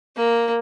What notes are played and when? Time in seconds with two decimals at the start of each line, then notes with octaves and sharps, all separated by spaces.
0.16 A#3